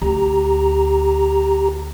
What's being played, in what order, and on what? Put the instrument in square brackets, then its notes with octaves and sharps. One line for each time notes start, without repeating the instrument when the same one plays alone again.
[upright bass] D2 [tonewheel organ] G4 A#5